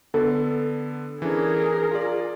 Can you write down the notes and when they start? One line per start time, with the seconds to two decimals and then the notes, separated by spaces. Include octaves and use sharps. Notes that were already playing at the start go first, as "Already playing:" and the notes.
0.14 D3 B3 A4
1.22 E3 C#4 D4 G#4 A#4
1.91 F4 D5